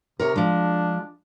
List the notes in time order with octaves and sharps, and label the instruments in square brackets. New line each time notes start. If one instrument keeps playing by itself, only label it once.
[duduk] C3 [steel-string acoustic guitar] A#4 C#5
[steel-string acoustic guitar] F3 G#3 [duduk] D4